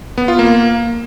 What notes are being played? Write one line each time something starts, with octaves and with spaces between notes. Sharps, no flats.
B3
F4
A#3